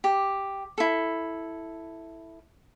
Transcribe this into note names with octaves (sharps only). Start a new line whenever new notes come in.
G4
E4 A4